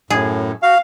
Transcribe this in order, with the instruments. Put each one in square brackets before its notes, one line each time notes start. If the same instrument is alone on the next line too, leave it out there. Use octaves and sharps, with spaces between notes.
[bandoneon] F#2 A2 [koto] G#4
[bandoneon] F#4 [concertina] F5